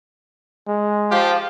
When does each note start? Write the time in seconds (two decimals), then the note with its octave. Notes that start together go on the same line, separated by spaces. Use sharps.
0.68 G#3
1.10 F3 F4 G4